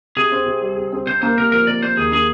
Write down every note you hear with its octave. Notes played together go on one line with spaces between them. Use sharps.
C3 G#4
C4
C3
G3
C3
C4
C3 C5
A#3 C5
C3 A#4
F3 A#4
C3 D5
A#3 C5
D#2 G#4
A#3 G#4